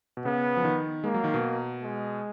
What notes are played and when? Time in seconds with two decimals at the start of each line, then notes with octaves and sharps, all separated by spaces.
0.17 B2
0.25 C#3 B3
0.57 F3
0.64 D#3
1.04 G#3 A#3
1.14 F#3
1.24 D#3
1.34 B2
1.83 G#3